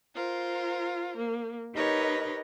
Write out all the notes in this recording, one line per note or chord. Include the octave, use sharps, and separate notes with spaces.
F4 A#4 C5
A#3
D#4 G4 A#4 B4 C#5 D#5